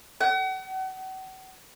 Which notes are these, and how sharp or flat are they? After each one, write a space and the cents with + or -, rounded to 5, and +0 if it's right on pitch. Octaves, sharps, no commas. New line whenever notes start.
F#5 +40